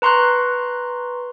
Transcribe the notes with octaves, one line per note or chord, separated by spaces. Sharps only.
B4 A#5 C6 C#6 F#6